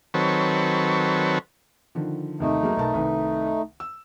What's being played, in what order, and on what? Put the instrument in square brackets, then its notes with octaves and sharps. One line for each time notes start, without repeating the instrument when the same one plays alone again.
[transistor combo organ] D#3 F#3 C4 A4 B4 C#5
[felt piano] D3 D#3 F3
[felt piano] D#2 C3 D#3 [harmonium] A3 D#4
[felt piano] F#3 G#3 A#3
B1 A#4 A5
C2 D#3 B4
E6